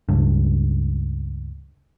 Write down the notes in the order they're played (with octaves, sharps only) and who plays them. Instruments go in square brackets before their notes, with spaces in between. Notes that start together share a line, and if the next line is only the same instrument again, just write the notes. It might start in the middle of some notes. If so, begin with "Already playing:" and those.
[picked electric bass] C#2 G2